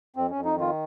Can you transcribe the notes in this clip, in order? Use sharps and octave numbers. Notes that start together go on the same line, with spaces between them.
F2 C4
F2 C#4
D#4
D#3 F4